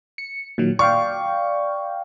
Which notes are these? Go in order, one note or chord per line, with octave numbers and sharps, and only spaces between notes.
C#7
A#2 D#3 F#3
D5 F5 G5 C#6